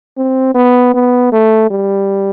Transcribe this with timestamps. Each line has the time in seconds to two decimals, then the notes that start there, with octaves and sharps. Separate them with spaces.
0.17 C4
0.54 B3
0.94 B3
1.32 A3
1.70 G3